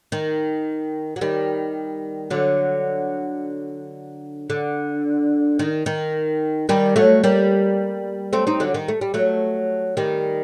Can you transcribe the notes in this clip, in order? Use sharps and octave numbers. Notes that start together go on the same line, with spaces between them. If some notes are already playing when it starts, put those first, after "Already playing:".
D#3
F#3
D#3 G3
D3 F#3
D3
D#3
D#3
D#3 G3
F#3 A3
G3 A#3
A3 C4
C4 D#4
D3 F#3
D#3
A3
G3
F#3 A3
D#3 G3